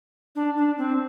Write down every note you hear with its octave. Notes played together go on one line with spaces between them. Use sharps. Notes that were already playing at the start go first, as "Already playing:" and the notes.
D4
D4
C4